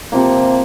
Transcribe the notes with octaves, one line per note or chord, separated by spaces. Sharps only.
C3 F3 A#3